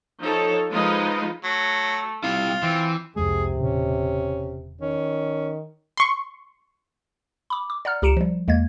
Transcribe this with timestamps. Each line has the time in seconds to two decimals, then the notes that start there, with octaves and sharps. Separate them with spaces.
0.21 F3 D#4 A4 C#5
0.72 F3 G#3 D#4 F4 B4 D#5
1.44 F#3 A3
2.24 G3 C4 E4 F4
2.63 E3 C4
3.16 C2 F2 C3 G#3 G#4
3.57 E1 A#2 C#3 C#4
4.81 D#3 C#4
5.97 C6 C#6
7.50 B5 D6
7.70 D6
7.85 D5 F#5 A#5 F6
8.02 C#2 G4 A#5 C#7 D7 E7
8.17 F3 G3
8.48 E2 G#3 A#3 G#6